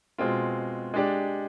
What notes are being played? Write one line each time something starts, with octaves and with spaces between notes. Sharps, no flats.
B2 G#3 C4 F4
G#3 D4 G4 D5